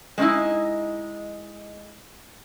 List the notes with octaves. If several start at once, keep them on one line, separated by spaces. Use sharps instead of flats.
G#3 C4 C#4 D#4 E4